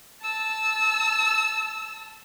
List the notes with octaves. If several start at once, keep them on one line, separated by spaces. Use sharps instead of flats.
A5 E6